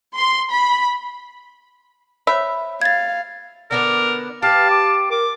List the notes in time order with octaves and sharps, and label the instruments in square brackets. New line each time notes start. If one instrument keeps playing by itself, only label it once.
[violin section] C6
B5
[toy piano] C5 C#5 B5 [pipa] E5
[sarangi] F5 [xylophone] G#6 A6
[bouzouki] D3 B3 D4 [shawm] A#4
[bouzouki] G4 B4 [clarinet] F5 [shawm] A5
[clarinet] D6
[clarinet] A#4 [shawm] D6